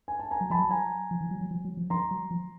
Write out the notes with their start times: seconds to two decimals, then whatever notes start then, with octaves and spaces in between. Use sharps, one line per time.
0.08 G#5
0.19 A5
0.31 G#5 A#5
0.41 F#3
0.50 F3 A5 B5
0.60 F#3
0.71 G#5 A#5
1.11 F3
1.21 E3
1.31 F#3
1.41 F#3
1.51 F3
1.65 F#3
1.77 F3
1.90 F3 A#5 C6
2.11 F#3
2.31 F3